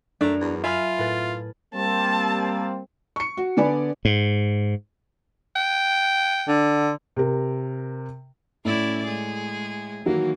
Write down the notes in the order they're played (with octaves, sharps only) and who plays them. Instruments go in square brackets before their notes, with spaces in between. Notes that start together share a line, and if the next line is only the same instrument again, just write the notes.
[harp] F#2 A#5 [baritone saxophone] A3 [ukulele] D4
[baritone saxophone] E2
[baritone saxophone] F4 [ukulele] E5 [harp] G#5 B5 F6
[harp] A2 B4 A6
[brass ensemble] G3 A#3 C4 [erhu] A5
[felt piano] C#6 C#7
F#4
D3 B3 D5 G#5 B5
[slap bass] G#2
[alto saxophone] G5
[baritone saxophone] D3
[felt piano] C3 A#4
[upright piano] A2 [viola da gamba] C#4 E4 D5
[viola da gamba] G#3 G#4
[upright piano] D#3 F#3 F#4 [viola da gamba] E3 A#3